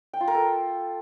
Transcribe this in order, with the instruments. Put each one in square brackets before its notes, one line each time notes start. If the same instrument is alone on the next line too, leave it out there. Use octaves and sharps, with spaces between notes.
[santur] G5
F4
A#4
A4